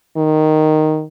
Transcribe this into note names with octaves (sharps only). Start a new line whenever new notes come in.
D#3